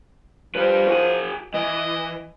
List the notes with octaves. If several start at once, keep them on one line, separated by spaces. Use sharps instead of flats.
F3 G3 B4
F#4 G#4
E3 D#5